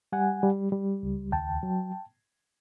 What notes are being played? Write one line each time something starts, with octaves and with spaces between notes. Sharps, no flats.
G3 F#5 G#5
G3
G3
C#2
D#2 G5 A5
F#3